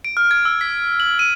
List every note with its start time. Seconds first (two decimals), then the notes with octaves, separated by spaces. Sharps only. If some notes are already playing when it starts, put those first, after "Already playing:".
0.05 D7
0.17 F6
0.31 G#6
0.45 E6
0.61 B6
1.00 F#7
1.19 D#7